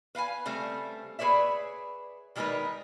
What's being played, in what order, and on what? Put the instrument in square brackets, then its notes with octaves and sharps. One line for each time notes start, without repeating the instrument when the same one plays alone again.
[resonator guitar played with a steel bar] B4 F5 F#5 G#5
C#3 G3 A3 C4
G#4 B4 C#5 D5 E5
D#3 G3 G#3 D#4 A#4 B4